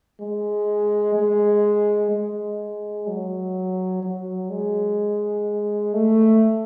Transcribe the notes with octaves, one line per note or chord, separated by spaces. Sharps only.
G#3
G#3
G#3
F#3
F#3
G#3
A3